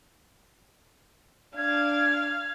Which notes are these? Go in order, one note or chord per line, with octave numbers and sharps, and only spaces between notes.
D4 F5 G#6